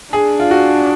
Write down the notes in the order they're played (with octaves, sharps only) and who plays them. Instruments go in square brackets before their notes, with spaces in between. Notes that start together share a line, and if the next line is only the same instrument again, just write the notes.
[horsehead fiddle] D4 [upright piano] G#4
[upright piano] F4
F#4